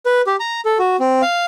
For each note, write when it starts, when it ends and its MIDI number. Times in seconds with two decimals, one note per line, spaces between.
0.06 0.22 71
0.27 0.36 67
0.40 0.61 82
0.65 0.78 69
0.79 0.96 66
1.00 1.22 60
1.22 1.46 77